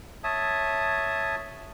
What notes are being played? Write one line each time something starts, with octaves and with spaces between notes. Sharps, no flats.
C#5 E5 A5 D#6